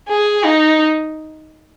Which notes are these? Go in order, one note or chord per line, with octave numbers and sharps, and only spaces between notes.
G#4
D#4